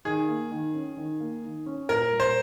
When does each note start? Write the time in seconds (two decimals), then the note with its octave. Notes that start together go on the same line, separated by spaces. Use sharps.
0.05 D#3 G#4
0.28 A#3
0.51 D#3
0.74 C#4
0.97 D#3
1.20 A#3
1.44 D#3
1.66 C#4
1.89 A#2 A#4
2.12 G3
2.20 C5